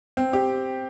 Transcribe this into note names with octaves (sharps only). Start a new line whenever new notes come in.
C4
G4